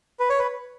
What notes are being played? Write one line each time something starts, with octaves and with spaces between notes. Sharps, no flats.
B4
C#5
B4